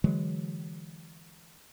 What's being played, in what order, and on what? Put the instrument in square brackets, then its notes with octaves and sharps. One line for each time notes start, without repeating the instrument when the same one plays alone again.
[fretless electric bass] D3 E3 F#3 G#3